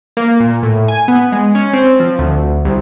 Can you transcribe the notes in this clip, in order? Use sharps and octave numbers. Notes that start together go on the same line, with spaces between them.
A#3
A#2
A2
G#5
B3
G#3
C#4
C4
F3
D2
C2